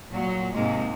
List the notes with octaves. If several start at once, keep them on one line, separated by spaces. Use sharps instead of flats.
A#2 F#3
G#2 C3 G#3 A#3